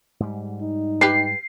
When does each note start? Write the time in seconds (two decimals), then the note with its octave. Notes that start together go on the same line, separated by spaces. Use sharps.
0.20 G#2 G3
0.61 D#4
1.01 G4 B4 C7